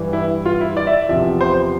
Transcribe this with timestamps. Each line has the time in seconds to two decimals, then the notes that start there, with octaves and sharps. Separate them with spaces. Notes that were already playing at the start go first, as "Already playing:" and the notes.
Already playing: G2 E3
0.13 E4
0.46 F4
0.61 E4
0.77 D5
0.87 E5
0.93 D5
1.09 E2 C3 F3 E5
1.41 C5